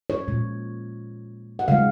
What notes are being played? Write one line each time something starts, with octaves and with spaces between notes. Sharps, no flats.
C#5
A#2 G#3
F#5
C#3 G#3 F5